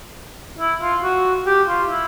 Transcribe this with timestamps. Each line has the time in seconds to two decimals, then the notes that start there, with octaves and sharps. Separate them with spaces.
0.59 E4
0.81 F4
1.03 F#4
1.46 G4
1.68 F4
1.89 E4